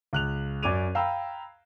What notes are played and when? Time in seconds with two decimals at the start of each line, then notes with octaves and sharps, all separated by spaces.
0.13 C#2 F#6 F7
0.63 F#2 D5 D6 G#6 D#7 F7
0.95 F5 G5 A#5 B5 E6